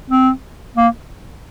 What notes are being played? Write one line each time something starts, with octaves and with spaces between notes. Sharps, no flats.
C4
A#3